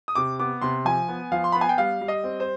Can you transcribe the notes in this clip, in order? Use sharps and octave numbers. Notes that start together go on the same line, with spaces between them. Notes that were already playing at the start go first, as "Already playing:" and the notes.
D#6
C3 D6
B3 D6
C3 C6
F3 G#5
B3
F3 F5
C6
B3 B5
G#5
G5
G3 F5
G3
D#5
C4
C5